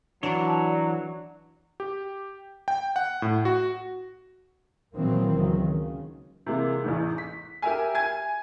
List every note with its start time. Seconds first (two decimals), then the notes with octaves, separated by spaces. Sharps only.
0.23 E3 F#3 D4 C#5
1.80 G4
2.68 G5
2.96 F#5
3.22 A2
3.45 F#4
4.95 A#2 D#3 E3 F#3 A#3 C4
5.34 C#2 D#3 F#3
5.67 C#3
6.46 C3 E3 G#3 A#3
6.84 A1 E2 G#2
7.18 B6
7.62 G4 A#4 E5 G#5
7.95 G#5 G#6